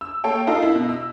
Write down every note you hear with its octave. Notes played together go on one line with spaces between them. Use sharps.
E6
A#3 A4 C#5 G5
D#4 F4 A4 A#4 D#5 F5
E4
B2
E6